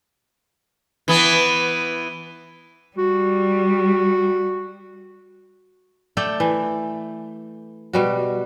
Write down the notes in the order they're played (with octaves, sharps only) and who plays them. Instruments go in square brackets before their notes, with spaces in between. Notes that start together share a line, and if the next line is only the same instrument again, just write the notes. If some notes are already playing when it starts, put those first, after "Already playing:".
[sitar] E3 B3
[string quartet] G3 [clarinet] F#4
[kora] A3 A4 D5 G5
E3
B2 G3 F#4